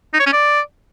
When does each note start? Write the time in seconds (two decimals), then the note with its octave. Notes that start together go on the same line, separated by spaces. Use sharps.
0.13 D#4
0.20 C#5
0.26 C#4
0.33 D5